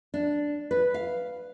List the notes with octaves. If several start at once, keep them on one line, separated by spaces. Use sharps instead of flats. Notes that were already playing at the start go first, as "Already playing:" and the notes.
D4
B4
F5